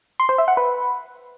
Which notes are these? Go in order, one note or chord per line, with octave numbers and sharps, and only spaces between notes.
C6
C5
E5
F#5
B4